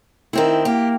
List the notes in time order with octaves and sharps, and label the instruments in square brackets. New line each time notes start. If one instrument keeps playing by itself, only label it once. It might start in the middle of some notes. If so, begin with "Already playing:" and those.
[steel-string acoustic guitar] D#3 C4 E4
[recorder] A#3 [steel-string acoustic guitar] G4